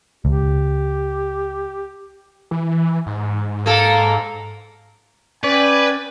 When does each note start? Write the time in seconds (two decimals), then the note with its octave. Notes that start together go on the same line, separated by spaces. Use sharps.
0.25 C#2 G4
2.51 E3
3.06 G#2
3.66 A#3 A4
5.44 C#4 B4 D5 G5 G#5